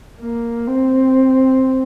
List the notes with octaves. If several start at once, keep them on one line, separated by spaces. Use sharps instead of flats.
A#3
C4